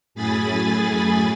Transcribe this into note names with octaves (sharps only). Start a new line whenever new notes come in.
F#2 A2 G#4 G#5 B5 A6